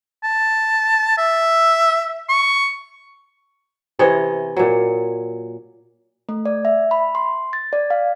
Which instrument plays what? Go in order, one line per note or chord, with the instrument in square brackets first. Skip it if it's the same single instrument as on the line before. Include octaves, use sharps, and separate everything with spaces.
[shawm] A5
E5
C#6
[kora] C3 E3 C#5 D#5
A#2 F#3
[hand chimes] A3
D5
E5
B5
C6
A6
D5
F5